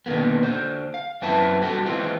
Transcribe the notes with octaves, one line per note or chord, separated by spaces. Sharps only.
B2 D3 D#3 A#3 B3
D3 C5
F5
F#2 C4 E4 B4 A5
G3 F#4 G4 A4
E3 G#3 C4 F4